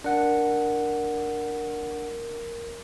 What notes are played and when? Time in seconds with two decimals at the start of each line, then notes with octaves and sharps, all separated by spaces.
0.04 D4 A#4 F#5